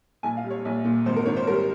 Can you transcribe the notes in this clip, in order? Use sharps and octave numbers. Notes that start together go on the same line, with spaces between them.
A#1 G#5
F5
G3
C#5
A#1
A#2
G#1 C5
A#4
D#3 C#5
C5
G3 A#4